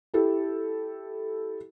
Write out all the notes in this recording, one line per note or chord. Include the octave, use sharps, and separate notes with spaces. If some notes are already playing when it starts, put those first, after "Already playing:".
E4 G4 A4